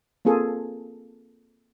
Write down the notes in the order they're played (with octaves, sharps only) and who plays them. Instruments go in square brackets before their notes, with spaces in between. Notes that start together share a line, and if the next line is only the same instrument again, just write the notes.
[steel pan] A#3 C4 F4 G#4 A4